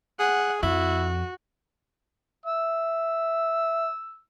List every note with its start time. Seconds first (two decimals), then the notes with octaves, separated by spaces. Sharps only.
0.19 G#4 F#5
0.63 F2 E4 F#4
2.46 E5 E6